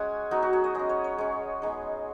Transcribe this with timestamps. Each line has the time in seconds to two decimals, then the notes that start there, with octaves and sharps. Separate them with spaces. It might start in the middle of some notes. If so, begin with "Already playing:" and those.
Already playing: G#3 C#4 F#5 G#5
0.31 F#3 B3 D#4
0.43 F#4
0.53 G#4
0.64 D#5
0.75 G#3 C#4 D#5
0.89 C#5
1.04 C#5
1.18 G#3 C#4 C#5
1.62 G#3 B3 D#4